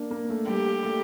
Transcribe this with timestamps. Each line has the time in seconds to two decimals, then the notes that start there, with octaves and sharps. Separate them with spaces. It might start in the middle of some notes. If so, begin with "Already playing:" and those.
Already playing: A#3 D4
0.11 A#3
0.30 A3
0.48 G3 G4
0.85 A3